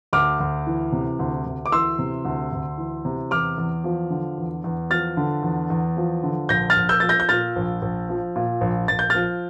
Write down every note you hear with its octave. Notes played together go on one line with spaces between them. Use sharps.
D2 D6 F6
D2
E3
C3
D2
D2
D6
E3 C6 E6
C3
D2
D2
E3
C3
E2 D6 F6
E2
F3
D3
E2
E2
F3 F6 A6
D3
E2
E2
F3
D3
A#1 G6 A#6
F6 A6
A#1
E6 G6
F3 A6
G6 A#6
G6
A#2 F6 A6
A#1
A#1
F3
A#2
A#1
A#1 A6
G6
F3 F6 A6